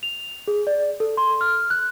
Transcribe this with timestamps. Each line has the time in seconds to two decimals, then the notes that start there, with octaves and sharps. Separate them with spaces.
0.03 F7
0.48 G#4
0.67 D5
1.00 A4
1.17 C6
1.41 F6
1.70 F#6